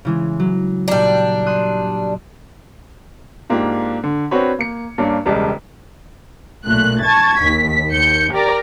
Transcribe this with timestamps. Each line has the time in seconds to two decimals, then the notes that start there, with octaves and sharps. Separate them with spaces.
0.05 C#3 E3 G#3
0.40 F#3
0.88 A#2 G3 D4 A#5
1.46 C6 D#6 F#6
3.50 G#2 A#3 D4 F4 G4
4.04 D3
4.31 C4 D4 F#4 B4 C#5 B5
4.59 A#3 C#7
4.98 G2 A#3 C#4 D4
5.26 E1 C#2 G3 G#3 D5 A5
6.66 B1 A#2 A3 F#6
7.02 A5 C#6 G#6 A6
7.38 D#2 B6
7.91 D#2 G6 C#7
8.32 G4 A#4 D5 A#5